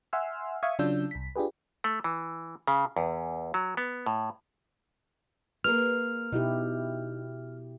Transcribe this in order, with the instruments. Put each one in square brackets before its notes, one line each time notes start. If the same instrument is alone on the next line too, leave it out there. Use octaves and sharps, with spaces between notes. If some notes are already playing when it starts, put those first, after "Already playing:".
[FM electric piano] E5 F#5 G#5 C6 E6 F6
E5 F5 C#6 D#6 G#6
C#3 F#3 D4 F4 E6 G6
C2 B6
D4 F4 G4 G#4 B4
[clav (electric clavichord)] A3
E3
C#3
E2
F#3
B3
A2
[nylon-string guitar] A#3 G#4 B4 [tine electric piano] F6
[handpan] B2 E4 G4 [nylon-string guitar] D#4